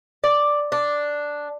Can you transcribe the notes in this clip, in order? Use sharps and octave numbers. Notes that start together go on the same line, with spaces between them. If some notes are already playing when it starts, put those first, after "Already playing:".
D5
D4